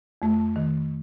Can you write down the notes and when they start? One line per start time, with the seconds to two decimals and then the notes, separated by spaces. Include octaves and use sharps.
0.22 F2 A3
0.56 D#3